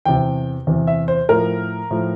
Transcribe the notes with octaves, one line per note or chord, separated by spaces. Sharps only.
E2 C3 E3 G5
E2 C3 E3
E5
C5
A2 F3 A#4
A2 F3